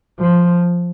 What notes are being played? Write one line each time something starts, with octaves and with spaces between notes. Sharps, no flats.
F3